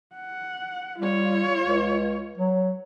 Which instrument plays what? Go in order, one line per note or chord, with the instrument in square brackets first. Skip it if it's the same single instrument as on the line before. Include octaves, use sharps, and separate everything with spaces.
[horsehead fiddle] F#5
[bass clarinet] G3 [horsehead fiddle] F4 C#5
[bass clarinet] C#2
F#3